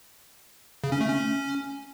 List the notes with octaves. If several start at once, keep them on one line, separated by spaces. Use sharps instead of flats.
C#3
C#4
A3
C#4